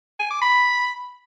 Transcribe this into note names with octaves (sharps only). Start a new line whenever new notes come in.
G#5
D6
B5